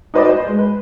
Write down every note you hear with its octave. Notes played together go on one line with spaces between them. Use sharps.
D#4 F#4 B4 C5 D5 D#5
B4 C5
G#3
B4